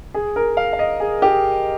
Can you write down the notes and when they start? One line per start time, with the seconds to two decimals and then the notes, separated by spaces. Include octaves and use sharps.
0.14 G#4
0.36 A#4
0.57 F5
0.73 F5
0.79 D#5
1.00 G#4
1.22 G4